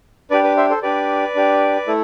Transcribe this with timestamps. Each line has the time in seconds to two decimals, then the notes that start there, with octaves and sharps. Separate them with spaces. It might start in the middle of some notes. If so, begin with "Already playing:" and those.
0.30 D4 G4 B4 D5
0.44 B4
0.57 C5 E5
0.70 A4 C5
0.83 D4 G4 B4 D5
1.35 D4 G4
1.87 A3 E4 A4